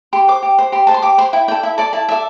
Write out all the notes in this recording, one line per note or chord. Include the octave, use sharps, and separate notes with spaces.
G4 C6
C5 D6
G4
C5
G4 C6
C5 A5
C6
G4 D6
C5 C6
E4 G5
A4 D5 G5
E4 E5
A4 D5 A5
E4 A5
A4 D5 E5